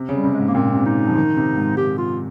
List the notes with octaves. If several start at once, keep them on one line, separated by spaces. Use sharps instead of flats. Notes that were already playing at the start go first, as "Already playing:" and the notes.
Already playing: C3
C#3
G3
C3
G#3
G#2
A#3
A#2 C4
C3
D#4
F3
D#3
C3
G#2
G#2 G4
F4